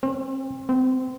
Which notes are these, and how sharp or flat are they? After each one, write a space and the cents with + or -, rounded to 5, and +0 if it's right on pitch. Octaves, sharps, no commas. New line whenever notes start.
C4 +35
C4 -25